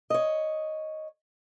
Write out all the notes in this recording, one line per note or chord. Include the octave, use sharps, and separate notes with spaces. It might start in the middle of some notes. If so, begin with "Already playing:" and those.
C#5 D#5